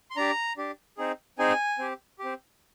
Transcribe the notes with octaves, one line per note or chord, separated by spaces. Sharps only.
C6
D4 G4 A#5
D4 G4
C4 D#4 G#4
C4 D#4 G#4 G#5
C4 G4
C4 G4